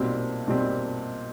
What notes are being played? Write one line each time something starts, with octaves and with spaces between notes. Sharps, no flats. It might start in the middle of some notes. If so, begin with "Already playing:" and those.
Already playing: B1 A#2 G3 C4
B1 A#2 G3 C4